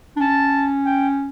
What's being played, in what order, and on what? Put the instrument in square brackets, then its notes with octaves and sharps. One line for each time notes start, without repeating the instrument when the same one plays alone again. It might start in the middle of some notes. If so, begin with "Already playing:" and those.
[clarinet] D4
[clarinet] C#4 [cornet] A5
[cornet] G5